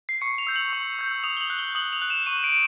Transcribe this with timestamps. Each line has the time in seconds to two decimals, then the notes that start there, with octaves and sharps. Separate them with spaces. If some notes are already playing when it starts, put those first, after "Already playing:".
0.09 C7
0.21 C#6 C#7
0.38 F7
0.47 E6 G6
0.56 F#7
0.73 C#6
0.99 E6 G6
1.24 D#6 F7
1.37 G7
1.41 F#7
1.50 F#6
1.59 G7
1.75 D#6 F#7
1.93 F7
2.02 F#6
2.10 E7
2.26 C#6 D#7
2.44 D7